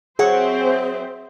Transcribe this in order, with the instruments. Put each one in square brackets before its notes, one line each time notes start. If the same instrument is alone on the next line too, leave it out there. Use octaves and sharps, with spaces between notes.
[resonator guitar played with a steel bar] F#3 C#5 F#5 [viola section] C4 C5 E5 [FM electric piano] G#4